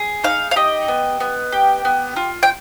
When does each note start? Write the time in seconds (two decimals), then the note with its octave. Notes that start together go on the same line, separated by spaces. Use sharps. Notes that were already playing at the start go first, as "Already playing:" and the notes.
Already playing: G#4
0.24 D#4 F5
0.51 F5
0.56 G4 D#5
0.88 B3
1.20 B3
1.52 G4
1.85 B3
2.16 F4
2.43 G5